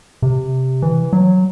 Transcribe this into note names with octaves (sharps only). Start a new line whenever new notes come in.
C3
E3
F#3